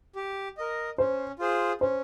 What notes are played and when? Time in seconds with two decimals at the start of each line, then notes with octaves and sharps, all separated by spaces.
0.16 G4
0.57 A#4 D#5
0.98 C#4 C5
1.39 F4 G#4 C5
1.81 C#4 C5